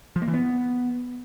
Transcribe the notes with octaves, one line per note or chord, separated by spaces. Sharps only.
F3
A#3
E3
B3